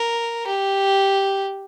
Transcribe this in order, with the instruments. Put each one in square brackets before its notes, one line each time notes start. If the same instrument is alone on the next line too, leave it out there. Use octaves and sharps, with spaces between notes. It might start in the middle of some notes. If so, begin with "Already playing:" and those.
Already playing: [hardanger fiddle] A#4
G4